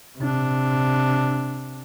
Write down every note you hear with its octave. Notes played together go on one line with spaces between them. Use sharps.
C3 D4